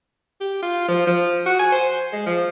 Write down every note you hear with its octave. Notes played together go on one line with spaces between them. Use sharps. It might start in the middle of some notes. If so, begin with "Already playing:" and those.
G4
F4
F3
F3
F#4
G#5
C5
G#3
F3